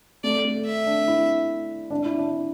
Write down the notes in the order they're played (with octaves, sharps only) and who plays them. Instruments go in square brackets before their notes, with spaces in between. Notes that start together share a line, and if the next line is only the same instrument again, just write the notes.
[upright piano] A3 [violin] D5
[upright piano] A3
[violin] E5
[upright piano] D4
E4
D4
E4
D4